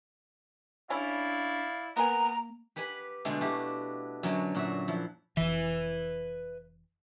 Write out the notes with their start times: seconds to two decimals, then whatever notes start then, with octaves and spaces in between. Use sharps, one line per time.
0.90 G3 C#4 D4 E4 D5 F5
1.97 A#3 B3 A#4 G#5 A#5
2.76 G4 B4 F#5 G#5 B5
3.25 B2 D3 G#3 A3 D4 G#5
3.41 E4 F#4 G4 A4 F5
4.23 F#2 D3 F#3 C#5
4.55 A#2 F#4 E5
4.88 F3 E4
5.37 F1 E3 B4 E5